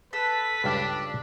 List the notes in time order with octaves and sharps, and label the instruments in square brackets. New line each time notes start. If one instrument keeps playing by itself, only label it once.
[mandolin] A4 [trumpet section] B4 [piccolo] B6
[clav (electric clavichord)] C#2 G2 G3 [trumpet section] D4